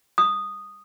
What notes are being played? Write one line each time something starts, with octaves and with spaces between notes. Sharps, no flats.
D#6